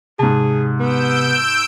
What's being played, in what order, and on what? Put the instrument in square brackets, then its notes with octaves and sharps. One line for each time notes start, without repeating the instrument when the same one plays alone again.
[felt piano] G#2 A5 [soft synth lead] C3 [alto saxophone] G#4
[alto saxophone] B3 [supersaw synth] E6 G6 D7